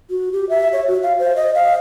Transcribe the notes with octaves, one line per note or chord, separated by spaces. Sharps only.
F#4
G4
E5
C#5
F#4
F5
C5
D#5
F5